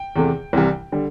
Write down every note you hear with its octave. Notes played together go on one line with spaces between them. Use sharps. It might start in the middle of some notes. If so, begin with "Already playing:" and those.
Already playing: G5
E2 C3 A3
C2 C3 E3 G3
D3 G3